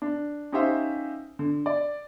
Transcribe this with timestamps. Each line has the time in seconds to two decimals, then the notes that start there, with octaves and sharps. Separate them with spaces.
0.02 D4
0.52 C#4 D#4 G4 C5 E5 F5
1.39 D3
1.66 D5